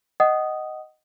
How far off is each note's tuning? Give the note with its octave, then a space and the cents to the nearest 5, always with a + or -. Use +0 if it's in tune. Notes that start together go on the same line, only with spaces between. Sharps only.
D#5 +0 F#5 +25 D#6 +0